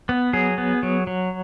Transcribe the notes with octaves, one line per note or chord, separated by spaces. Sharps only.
B3
F#3 G#4
B3
F#3
F#3